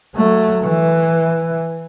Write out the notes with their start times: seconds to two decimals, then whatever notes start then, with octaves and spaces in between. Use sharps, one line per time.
0.15 F#3 A3
0.64 E3